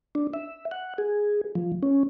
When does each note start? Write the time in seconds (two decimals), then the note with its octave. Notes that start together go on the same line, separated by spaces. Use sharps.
0.15 D4
0.34 E5
0.71 F#5
0.98 G#4
1.55 F3
1.83 C#4